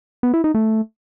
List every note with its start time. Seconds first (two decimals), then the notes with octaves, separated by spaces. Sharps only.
0.23 B3
0.34 E4
0.44 D#4
0.55 A3